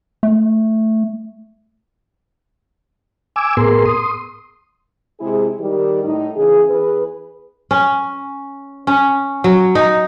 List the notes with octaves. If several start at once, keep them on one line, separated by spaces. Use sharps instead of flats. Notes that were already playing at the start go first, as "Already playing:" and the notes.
A3
G#5 D6 E6
A2 B3 G#4 A#4 C6
C6 D#6
C3 G#3 E4 G#4
D#3 G3 G4
A2 D#4
C#3 E3 G#4
E2 G#4 B4
C#4
C#4
F#3
D#4